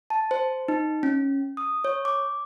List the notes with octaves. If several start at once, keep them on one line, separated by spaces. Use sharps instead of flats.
A5
C5
D#4
C#4
D#6
C#5
D6